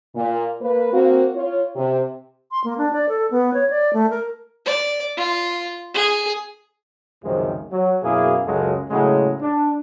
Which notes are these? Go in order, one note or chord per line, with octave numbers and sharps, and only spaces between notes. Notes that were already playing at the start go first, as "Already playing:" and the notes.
A#2
A#3 B4
A#3 C4 F#4
F4 C#5
C3
C6
A#3
D4
D5
A4
B3
C#5
D5
A3
A#4
D5
F4
G#4
C#2 F#2 C3 D#3 F3 G#3
F#3
F#2 B2 A#3 E4 G#4
C#2 F#2 C#3 F#3 G#3 A4
A2 C#3 F#3 G#3
D4